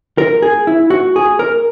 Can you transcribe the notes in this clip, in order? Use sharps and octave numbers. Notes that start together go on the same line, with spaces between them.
A#4
G#4
E4
F#4
G#4
A#4